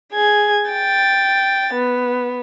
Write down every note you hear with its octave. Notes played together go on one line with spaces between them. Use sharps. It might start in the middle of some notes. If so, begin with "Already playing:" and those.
G#4 G#6
G5 A6
B3